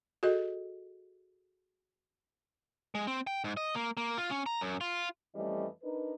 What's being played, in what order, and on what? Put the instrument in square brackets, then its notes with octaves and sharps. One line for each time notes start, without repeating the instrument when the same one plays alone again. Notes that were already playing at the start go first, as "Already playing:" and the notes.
[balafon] F#4 G#4 A4 D#5
[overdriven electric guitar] G#3
C4
G5
G#2
D#5
A#3
A#3
F4
C#4
A#5
F#2
F4
[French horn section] F2 E3 G3 A3 C#4 D#5
D4 D#4 A#4 B4